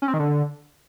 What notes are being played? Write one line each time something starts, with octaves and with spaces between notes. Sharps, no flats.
C#4
C4
D#3
D3